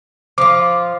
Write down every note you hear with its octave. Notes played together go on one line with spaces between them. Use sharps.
F3 F4 D6